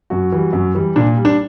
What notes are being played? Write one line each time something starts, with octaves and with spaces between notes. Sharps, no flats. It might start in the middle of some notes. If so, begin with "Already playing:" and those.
F#2 F#4
E3 G3
F#2
E3 G3
A#2 D4
G3
D4